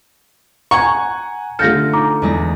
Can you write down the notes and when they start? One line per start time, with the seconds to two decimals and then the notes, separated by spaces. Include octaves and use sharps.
0.71 F#5 G#5 A#5 C#6 G#6
1.59 D3 A3 F4 A4 F6 G6 A#6 C#7
1.93 D#4 A#5 D6
2.22 E2 G#3 A#6